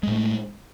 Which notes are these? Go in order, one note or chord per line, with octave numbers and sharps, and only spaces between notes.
A2 G#3 A3